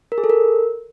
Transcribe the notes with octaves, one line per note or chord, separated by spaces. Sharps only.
A#4
G#4
A4
A#4